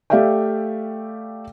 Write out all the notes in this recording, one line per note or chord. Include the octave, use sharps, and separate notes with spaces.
A3 G4 D5 E5 F5 G5